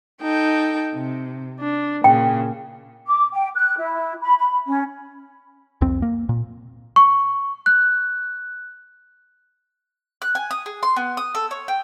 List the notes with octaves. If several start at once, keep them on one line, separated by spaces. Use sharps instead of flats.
D#4 A4 G5
C3
D4
A#2 C#3 G5
D6
G5
F#6
E4
B5
B5
C#4
C2 F2 C4
A#3
A#2
C#6
F#6
F#6
G#5
D#6
G#4
C6
B3
D#6
A4
C#5
G5